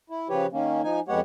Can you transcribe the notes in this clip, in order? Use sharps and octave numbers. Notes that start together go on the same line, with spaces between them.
E4
C#3 F3 G4 B4 C#5
D#3 A#3 C#4
F3 D#4 G#5
F2 G#3 B3 G4 C#5 F#5